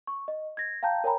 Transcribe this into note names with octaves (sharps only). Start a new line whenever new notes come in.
C#6
D#5
G#6 A#6
F5 G5 A5 A#5 G6
A#4 C#5 G5 G#5 A#5 B5